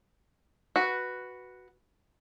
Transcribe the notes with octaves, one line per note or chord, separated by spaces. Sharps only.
F#4 B4